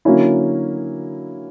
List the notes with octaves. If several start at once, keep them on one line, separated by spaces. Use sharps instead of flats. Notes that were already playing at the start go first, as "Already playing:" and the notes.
D3 F#3 A#3 C#4 E4